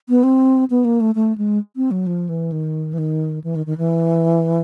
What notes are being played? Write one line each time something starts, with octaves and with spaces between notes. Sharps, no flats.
B3
C4
B3
A#3
A3
A3
G#3
C4
F#3
F3
E3
D#3
E3
D#3
E3
D#3
D#3
E3